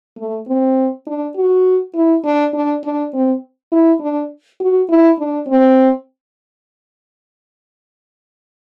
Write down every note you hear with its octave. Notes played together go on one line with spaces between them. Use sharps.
A3
C4
D4
F#4
E4
D4
D4
D4
C4
E4
D4
F#4
E4
D4
C4